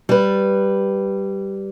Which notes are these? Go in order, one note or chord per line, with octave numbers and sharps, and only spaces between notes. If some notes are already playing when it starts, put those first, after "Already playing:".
G3 B4